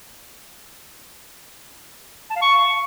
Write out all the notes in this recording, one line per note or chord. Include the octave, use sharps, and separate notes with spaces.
A5
F5
C#6